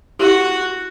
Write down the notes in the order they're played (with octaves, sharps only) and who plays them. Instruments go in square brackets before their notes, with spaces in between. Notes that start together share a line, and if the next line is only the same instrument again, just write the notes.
[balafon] E4 G4 [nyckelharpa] F#4